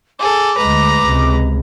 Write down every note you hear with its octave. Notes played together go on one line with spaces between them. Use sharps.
G#4 A4 D6
D2 G#3 B4 A#5
C#2 C3 G#3